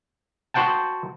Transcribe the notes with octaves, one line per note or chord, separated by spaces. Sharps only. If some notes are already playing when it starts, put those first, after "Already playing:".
F#4 C5 F#5 G5 A5